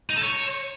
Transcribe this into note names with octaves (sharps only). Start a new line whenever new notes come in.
D#4
A4
C#5